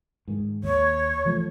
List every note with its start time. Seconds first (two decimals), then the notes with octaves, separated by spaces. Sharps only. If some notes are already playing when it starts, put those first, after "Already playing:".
0.28 G#2 D#3
0.64 D#2 C#5
1.25 E3 F3 A3